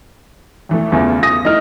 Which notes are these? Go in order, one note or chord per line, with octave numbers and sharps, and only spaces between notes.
E2 E3 A3
E2 C#3 A3 F4
D#6 A#6
A3 D#4 E4 D#5 F6